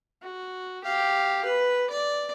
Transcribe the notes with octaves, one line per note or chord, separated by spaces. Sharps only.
F#4
G4 F5
B4
D5